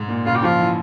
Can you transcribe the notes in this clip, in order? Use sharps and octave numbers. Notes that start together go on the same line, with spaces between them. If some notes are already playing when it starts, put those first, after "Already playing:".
Already playing: G#2
A#2
C#3 F4
G4
F3 F4
E3